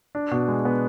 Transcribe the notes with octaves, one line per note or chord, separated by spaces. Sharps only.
D4
B2
G#3
B3